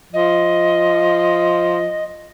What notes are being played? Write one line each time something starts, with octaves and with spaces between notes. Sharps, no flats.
F3 D#5